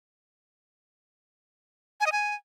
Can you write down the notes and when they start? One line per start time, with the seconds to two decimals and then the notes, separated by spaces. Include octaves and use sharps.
2.00 G#5
2.06 D#5
2.12 G#5